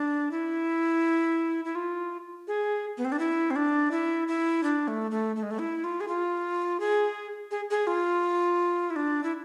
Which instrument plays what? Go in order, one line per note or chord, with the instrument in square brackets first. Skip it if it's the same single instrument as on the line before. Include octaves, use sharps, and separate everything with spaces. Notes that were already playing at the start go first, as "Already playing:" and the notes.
Already playing: [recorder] D4
E4
E4
F4
G#4
B3
C4
D4
E4
C4
D4
E4
E4
D4
A3
A3
A3
G#3
A3
E4
F4
G#4
F4
G#4
G#4
G#4
F4
E4
D4
E4